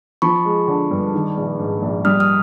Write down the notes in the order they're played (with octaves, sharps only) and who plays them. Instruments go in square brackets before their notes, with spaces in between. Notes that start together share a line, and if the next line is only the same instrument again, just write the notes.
[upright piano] F3 [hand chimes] B5 C#6
[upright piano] G#3
D3
G2
D#3
A#1
G#2
A#1
[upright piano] G3 [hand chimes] D#6 F6
[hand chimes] D#6 F6